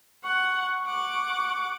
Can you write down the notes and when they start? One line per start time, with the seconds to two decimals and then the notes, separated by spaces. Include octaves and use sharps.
0.24 F#5 C#6
0.86 F#5 D6